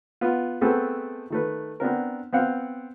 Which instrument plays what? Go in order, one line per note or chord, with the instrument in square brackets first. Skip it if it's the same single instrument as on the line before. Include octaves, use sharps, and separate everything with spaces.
[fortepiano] B3 F4
A3 B3 C4 G#4 A4 B4
D#3 A3 B4
B3 C4 D4 A#4
B3 C4 F5 F#5